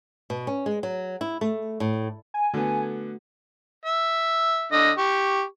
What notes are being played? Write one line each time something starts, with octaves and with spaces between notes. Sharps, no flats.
B2
C#4
G#3
F#3
E4
A3
A2
G#5
D3 A3 B3 F#4
E5
D3 D#5
G4 C#6